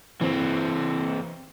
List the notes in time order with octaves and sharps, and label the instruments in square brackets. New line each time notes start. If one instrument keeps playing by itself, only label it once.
[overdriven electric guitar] E3 C4